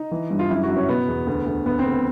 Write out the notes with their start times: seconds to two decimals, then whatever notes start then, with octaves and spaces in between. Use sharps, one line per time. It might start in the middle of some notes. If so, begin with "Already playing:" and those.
Already playing: D#4
0.11 E3
0.30 G2
0.39 F4
0.49 F#2 E4
0.63 F#4
0.69 F#2
0.76 C#4
0.88 B2 B3
1.08 E2
1.27 D2
1.46 D2
1.66 D2 B3
1.79 C4
1.85 D2
1.92 B3